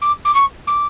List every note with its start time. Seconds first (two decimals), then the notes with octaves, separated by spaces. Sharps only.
0.01 D6
0.25 D6
0.34 C#6
0.67 D6